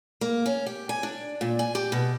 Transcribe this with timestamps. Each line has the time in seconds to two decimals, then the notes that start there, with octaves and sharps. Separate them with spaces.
0.21 A#3
0.46 C#4
0.66 G4
0.89 G#5
1.03 D4
1.41 A#2
1.59 G#5
1.75 G4
1.92 B2